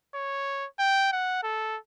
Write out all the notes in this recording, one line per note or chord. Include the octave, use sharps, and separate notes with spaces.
C#5
G5
F#5
A4